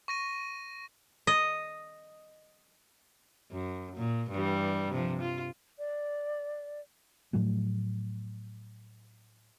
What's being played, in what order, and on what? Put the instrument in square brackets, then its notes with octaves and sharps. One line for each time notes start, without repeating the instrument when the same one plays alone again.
[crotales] C#6 A#6 D#7
[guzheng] D#5
[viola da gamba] F#2
A#2
G2 E3 G3
C3 F3
F4
[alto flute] D5
[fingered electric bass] A2 F3 F#3 A3